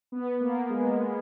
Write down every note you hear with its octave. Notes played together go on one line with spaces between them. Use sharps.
B3
A#3
G#3